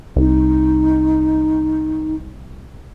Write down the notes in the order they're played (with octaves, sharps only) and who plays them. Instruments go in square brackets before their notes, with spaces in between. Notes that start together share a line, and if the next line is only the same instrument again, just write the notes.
[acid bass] C2 [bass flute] D#4